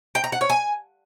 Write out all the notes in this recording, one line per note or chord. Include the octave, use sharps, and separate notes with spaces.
G5
A#5
F#5
C#5
G#5